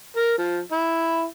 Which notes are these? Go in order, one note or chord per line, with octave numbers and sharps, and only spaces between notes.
A#4
F3
E4